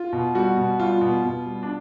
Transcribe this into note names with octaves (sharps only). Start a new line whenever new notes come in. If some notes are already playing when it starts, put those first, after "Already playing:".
Already playing: F4
B2
G3 F#4
B2
G3 F4
B2
B2
G3
D4